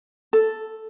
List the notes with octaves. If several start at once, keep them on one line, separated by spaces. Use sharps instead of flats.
A4